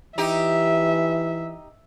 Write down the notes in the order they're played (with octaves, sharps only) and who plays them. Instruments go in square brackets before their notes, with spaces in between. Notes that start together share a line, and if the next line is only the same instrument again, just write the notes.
[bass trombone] E3 [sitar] D#4 G4 [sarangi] E5